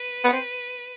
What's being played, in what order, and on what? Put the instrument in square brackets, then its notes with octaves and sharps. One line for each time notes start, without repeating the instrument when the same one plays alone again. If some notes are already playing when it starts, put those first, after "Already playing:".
Already playing: [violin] B4
[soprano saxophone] B3
C4